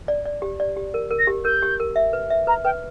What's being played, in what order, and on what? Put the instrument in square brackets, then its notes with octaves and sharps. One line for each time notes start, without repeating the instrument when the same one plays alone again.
[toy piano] D5
D5
G4
D5
G4
A#4
A#4
[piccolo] A#6
[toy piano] G4
[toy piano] A#4 [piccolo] G6
[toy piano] G4
A#4
E5
B4
E5
[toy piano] B4 [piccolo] A#5
[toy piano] B4 [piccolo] G5